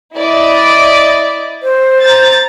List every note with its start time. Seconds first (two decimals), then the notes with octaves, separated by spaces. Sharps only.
0.15 E4 D5 D#5
1.62 C5
2.00 A#5 A6